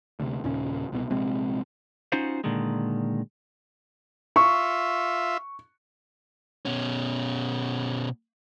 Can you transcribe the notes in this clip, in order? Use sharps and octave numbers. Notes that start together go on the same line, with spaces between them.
D2 C3
D#2 A#2 C#3 C#4
C2 B2
A#1 C3 G#3 C4
C#4 D#4 F4 F#4 C5 F5
A#2 D3 D#3 G#3
F4 E5 C#6
B2 C#4